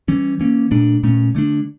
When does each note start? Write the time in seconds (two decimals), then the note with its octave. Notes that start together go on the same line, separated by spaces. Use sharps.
0.08 E3 G3 C#4
0.40 E3 A#3 C#4
0.71 A#2 A3 D4
1.03 A#2 A3 C#4
1.35 D3 A3 D4